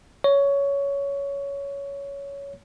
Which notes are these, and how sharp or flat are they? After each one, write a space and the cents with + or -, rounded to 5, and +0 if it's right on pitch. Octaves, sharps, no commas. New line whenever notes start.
C#5 +15